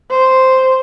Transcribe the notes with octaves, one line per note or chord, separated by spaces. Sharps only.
C5